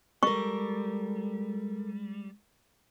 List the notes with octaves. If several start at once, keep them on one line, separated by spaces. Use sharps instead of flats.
G3 G#3 A4 A#4 C#6